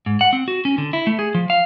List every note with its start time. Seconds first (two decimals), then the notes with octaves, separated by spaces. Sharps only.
0.06 G#2
0.21 F#5
0.33 C4
0.48 F#4
0.65 C#4
0.78 D3
0.93 E4
1.07 A3
1.19 G#4
1.35 F3
1.50 F5